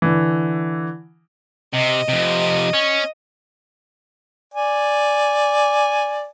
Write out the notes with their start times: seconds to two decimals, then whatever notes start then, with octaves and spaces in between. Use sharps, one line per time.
0.02 D3 E3
1.74 C3 D#5
2.09 F2 C3
2.73 C#4
4.54 D5 G#5